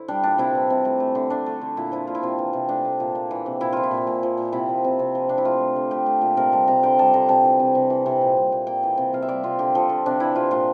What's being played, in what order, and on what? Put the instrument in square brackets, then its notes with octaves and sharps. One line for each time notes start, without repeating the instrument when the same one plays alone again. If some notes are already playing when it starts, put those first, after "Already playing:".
Already playing: [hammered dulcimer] D3 E4 C5
G3 D4
A#2 D4
C3 E4
E3
C3
A3
A3
D3
A3 D4
A3
D3
A#2 E4
F3 E4
A#2 F4
E4
C3 F4
E3
C3
A3 D4
A3
A#2
A#3
E3
C3
A#2 E4
F3 F4
E4
A#2
A#2
F3
A#2
C3 E4
F3
C3
C3
F3
C3 D4
E4
A3 F4
A3
D3
A3 G4
A3
A#2
C3 A#4
G3 A5
C3 A#5
D3 G5
G3 A5
D3 A#5
C3 A5
E3
C3
C3
E3
C3
A#2
G3
A#2
A#3 G5
E3
C3
C3 F5
E5
G3 D5
C3 F4
D3 G4
F3 A4
D3
C3 D4
E3 E4
C3 F4
A#2 F4